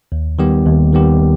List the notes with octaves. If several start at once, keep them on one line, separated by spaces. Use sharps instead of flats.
D#2
D#3 G3 B3 G4
D#2
D#3 G3 B3 G4